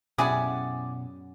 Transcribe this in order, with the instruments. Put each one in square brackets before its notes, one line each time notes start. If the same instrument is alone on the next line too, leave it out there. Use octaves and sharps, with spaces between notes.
[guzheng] F#2 [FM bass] B2 [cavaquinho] E4 D5 F#5 [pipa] G4 G#4